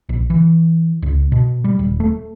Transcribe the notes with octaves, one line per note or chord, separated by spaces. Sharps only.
A#1
E3
C#2
B2
G3
D#1
A3